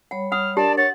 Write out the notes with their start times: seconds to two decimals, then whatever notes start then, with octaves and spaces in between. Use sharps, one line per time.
0.11 G3 C#5 F#5 B5
0.32 F#5 D#6 F6
0.57 D4 G4 A#4 D5 A5
0.78 C#5 F#5 A6